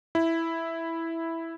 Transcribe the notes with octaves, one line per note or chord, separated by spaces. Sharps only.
E4